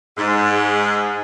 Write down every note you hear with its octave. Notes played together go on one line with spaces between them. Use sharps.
G#2